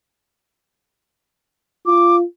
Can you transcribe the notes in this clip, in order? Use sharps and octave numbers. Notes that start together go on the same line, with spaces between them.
F4 D6